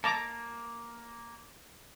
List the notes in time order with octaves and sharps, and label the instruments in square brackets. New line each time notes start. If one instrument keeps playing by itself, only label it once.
[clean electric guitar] A#3 [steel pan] A5 A#5 D6